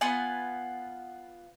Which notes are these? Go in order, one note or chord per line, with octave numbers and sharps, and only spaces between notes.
B3 F4 F#5 G#5